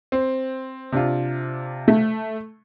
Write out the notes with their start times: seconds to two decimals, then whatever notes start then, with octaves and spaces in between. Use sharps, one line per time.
0.12 C4
0.92 C3 D4 F4
1.88 A3